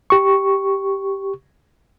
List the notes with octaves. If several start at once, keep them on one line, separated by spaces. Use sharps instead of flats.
G4 C#6